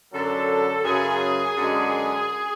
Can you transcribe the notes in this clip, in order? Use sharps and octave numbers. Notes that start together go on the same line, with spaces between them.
F#2 D3 F#3 A4
F#2 C#3 F#3 G#4
F#2 D3 G#3